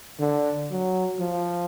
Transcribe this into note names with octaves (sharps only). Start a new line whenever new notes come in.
D3
F#3
F3